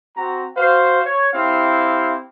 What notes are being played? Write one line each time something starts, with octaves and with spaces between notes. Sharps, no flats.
C4 F#4 A#5
F#4 C5 F5
C#5
C4 E4 G4 F5